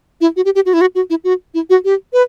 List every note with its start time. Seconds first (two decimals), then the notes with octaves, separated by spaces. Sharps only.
0.21 E4
0.36 F#4
0.45 G4
0.55 G4
0.66 F#4
0.74 E4
0.81 F#4
0.95 F#4
1.10 E4
1.24 F#4
1.54 E4
1.70 F#4
1.85 G4
2.13 B4